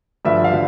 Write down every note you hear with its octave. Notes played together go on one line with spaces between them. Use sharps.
G2 D3 F3 D5 E5
F5
D3 F3